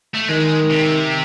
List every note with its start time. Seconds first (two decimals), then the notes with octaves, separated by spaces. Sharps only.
0.15 A3
0.29 D#3 G#3
0.71 C3